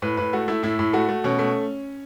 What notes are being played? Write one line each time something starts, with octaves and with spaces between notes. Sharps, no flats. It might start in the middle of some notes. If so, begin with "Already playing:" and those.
A2 B4
A2 B4
A3 F#4
A3 E4
A2 E4
A2
A3 F#4
A3
B2 C#4
A3